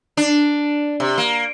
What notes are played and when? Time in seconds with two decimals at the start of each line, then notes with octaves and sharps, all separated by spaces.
0.17 D4
1.00 C3
1.18 A#3